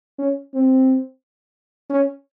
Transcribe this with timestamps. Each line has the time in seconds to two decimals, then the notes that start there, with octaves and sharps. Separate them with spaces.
0.19 C#4
0.54 C4
1.90 C#4